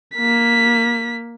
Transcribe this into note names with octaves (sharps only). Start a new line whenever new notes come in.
A#3 B6